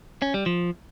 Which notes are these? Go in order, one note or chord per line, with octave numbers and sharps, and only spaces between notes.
C#4
G3
F3